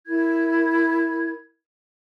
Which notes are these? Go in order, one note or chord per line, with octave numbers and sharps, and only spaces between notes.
E4 A#4 G#6